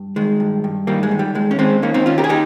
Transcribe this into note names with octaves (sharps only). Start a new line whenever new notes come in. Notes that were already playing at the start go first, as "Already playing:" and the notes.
Already playing: G2
D#3 G#3
G2
G2
D#3 G3 A#3
G#3
D#3
G3
D#2 G#3
C#4
D#2 G#3 C4
D#3 A#3 C#4
C4 D#4
D#3 C#4 F4
G4 A#4
G#4
D#4 G4